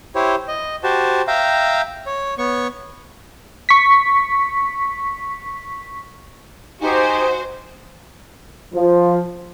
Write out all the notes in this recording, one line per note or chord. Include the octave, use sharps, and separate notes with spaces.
E4 G4 C5 C#5
D#5
F#4 G4 C5 A5
E5 F5 G5 A#5
C#5
B3 C#5 C#6
C#6 B6
D#4 F#4 G4 C5 G#5
F3